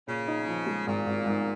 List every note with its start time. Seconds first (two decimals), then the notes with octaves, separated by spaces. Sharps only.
0.07 A#2 C#3
0.28 D#4
0.48 F3
0.66 G#3
0.87 G#1 A#2
1.07 G#1
1.26 G#2